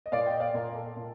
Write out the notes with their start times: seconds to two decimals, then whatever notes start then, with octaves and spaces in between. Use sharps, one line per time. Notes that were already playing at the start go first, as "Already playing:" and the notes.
0.06 D#5
0.12 A#2 D5 F5
0.26 D#5 G5
0.40 D5 F5
0.54 A#2 A#4
0.76 A4
0.96 A#2